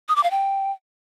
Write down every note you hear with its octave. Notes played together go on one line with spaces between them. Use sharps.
D#6
D6
F5
G5